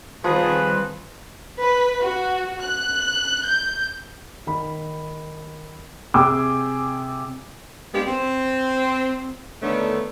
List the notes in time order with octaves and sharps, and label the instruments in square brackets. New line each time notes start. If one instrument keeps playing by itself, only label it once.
[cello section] D#3 G3 C4 [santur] F3 [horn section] G#4 G#5 [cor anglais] B4
[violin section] B4
F#4
F#6
G6
[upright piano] D#3 B5
C3 G#4 G5 G#5 D6 E6
[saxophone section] G3 G#3 A#3 B3 D4 G4
C4
D3 D#3 A3 B3 D4 C#5